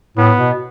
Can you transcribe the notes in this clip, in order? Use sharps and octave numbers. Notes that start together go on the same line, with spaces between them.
A2 B3
B2